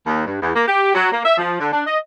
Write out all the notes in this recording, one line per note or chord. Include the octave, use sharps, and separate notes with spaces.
D#2
G2
E2
A#3
G4
F#3
A#3
E5
F3
D3
D4
D#5